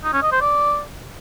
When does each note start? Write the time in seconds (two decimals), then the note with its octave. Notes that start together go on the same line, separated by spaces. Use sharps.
0.04 D#4
0.13 C#4
0.23 D#5
0.32 C5
0.41 D5